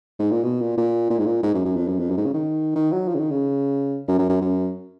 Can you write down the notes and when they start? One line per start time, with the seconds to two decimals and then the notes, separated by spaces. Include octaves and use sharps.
0.19 G#2
0.31 A#2
0.44 B2
0.61 A#2
0.78 A#2
1.10 A#2
1.19 G#2
1.26 A#2
1.43 G#2
1.54 F#2
1.65 F#2
1.76 F2
1.88 F#2
1.99 F2
2.10 F#2
2.17 G#2
2.26 C#3
2.34 D#3
2.75 D#3
2.92 F#3
3.08 F3
3.14 C#3
3.19 D#3
3.31 C#3
4.08 F#2
4.19 F#2
4.29 F#2
4.41 F#2